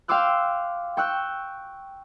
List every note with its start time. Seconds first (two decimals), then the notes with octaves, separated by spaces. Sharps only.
0.08 F5 G5 C6 D6 E6 F#6
0.97 G5 C#6 E6 F#6